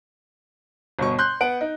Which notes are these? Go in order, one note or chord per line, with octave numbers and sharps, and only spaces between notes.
G1 B2 C#6
C6 F#6 G6
B3 F#5 D7
D#4